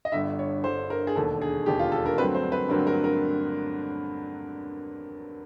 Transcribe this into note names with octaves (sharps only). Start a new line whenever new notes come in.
D#5
G1 G2 D3 E5
C#5
G1 G2 D3 C5
A#4
G#4
E1 D#2 D3 A4
G#4
E1 D#2 D3 G4
F4
A4
A#4
G2 D3 F#3 A3 C4 B4
C5
B4
G2 D3 F#3 A3 C4 A#4
A#4
A#4